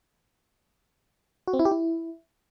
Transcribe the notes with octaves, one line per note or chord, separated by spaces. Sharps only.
F#4
C4
E4
G4
E4